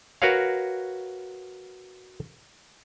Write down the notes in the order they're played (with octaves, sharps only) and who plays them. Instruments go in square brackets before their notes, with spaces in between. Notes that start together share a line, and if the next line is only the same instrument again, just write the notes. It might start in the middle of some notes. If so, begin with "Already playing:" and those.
[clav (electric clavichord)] F#4 A#4 B4 C#5 F5